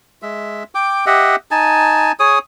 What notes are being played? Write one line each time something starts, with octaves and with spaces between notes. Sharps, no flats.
G#3 E5
G5 D6
G4 D#5 E5 F#5
D#4 G#5 A5
G#4 C#5 D#6